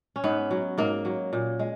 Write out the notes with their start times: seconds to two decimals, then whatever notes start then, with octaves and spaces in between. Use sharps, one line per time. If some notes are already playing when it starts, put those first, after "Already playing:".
0.16 C#4
0.24 G#2 B3
0.51 F#3
0.78 G#2 A#3
1.05 F#3
1.33 A#2
1.59 G#3